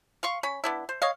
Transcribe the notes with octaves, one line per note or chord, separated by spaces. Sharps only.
F5 C6 C#6
C#4 B5
B3 D4 E4
C5
C#5 D#5 F5